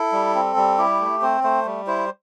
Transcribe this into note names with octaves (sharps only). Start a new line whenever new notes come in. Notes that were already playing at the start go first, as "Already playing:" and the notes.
Already playing: E4 A4
G3
C4
G3
E4 G4
A3
C4 C5
A3 C5
G3
E4 C5